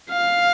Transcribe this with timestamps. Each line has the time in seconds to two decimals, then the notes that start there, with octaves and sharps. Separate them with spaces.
0.11 F5